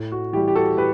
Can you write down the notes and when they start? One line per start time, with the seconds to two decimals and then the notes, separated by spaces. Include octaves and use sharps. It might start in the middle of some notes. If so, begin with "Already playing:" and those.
Already playing: A2
0.12 F#4
0.33 E3 G3 E4 G4
0.48 G4
0.55 F#4 A4
0.77 A2 G4 B4